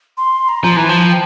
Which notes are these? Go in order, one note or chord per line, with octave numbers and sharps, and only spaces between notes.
C6
A#5
F3
E3 A5
F3
G5